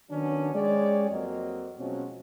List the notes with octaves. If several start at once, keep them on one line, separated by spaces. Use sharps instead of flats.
D#3 F#3 B3 C#4 D4
G#3 C#4 G4 C#5 D5
F2 F#3 A#3 C4 D#5
B2 F3 F#3 G#3 C4 C#4